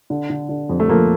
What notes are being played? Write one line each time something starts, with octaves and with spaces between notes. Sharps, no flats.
D3
D3
D3
F2
A3
F3 A#3